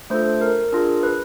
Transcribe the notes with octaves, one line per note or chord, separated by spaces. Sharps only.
A3 D4 F4 A4 C5
A#4
D4 F4 G#4
B4